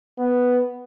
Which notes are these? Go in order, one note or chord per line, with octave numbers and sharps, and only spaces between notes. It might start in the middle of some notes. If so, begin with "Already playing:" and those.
B3